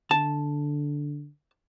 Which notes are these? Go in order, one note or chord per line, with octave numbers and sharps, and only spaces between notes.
D3 A5